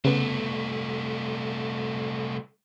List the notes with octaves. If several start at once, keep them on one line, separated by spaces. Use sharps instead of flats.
C2 C#3 A3 B3